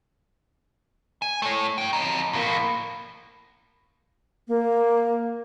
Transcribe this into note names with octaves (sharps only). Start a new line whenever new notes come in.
G#5
A3 C#5
D4 G5
F2 D#4
A2 A#3
A#3